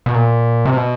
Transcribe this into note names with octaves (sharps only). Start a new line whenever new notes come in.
B2
A#2
C3
B2